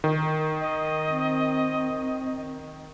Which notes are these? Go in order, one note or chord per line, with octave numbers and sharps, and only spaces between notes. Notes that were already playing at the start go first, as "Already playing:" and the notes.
D#3
D#5
C4